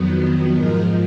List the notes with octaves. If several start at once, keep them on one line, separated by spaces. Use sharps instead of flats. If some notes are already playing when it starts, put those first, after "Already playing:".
Already playing: F2 D#3 F#3 B3
G#2 F3 G#3 A#4